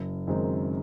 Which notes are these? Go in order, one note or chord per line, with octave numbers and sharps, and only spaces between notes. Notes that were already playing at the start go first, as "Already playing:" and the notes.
Already playing: F#1
F#2 D#3 G#3 C4